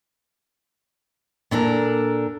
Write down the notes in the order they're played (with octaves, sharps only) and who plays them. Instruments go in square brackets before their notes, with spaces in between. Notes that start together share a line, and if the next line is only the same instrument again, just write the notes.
[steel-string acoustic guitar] A#2 D4 A4 A#4